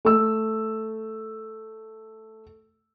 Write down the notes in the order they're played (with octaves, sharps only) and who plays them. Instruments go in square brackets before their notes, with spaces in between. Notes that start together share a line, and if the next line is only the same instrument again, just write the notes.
[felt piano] A3 E6